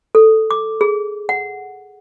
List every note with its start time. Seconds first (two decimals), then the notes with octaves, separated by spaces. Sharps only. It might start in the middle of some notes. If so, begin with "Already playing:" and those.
0.15 A4
0.51 D6
0.81 G#4
1.29 F#5